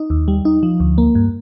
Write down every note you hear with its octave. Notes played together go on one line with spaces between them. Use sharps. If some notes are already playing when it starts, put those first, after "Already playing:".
Already playing: D#4
D#2
G3
D#4
F3
D2
A#3
G2